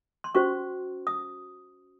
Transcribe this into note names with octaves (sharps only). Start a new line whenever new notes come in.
C6
C#4 F#4 C5 C#6
D#6